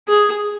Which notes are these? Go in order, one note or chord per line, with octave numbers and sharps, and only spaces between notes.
G#4